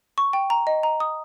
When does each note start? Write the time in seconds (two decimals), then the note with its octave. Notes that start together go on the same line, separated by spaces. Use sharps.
0.18 C#6
0.33 G5
0.50 A#5
0.67 D#5
0.83 A#5
1.00 D#6